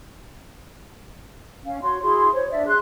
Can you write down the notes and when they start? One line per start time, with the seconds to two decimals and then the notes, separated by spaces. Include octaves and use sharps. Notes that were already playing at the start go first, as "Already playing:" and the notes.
1.64 C#4 F5
1.82 F#4 C#5 C6
2.02 E4 F#4 G#4 C6
2.33 C5 C#5
2.49 D4 D5 E5
2.66 G#4 C6 F#6